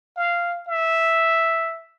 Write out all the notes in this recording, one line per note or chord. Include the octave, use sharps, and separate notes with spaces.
F5
E5